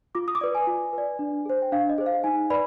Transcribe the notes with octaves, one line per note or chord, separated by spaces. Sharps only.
F4 D6
D#6
D6
B4 D5 D#6
G#5
F4
B4
D5
D4
G#4 C5
G5
D4 F5
D#5
G#4 C5
F5
D#4 G#5
B4 D5 B5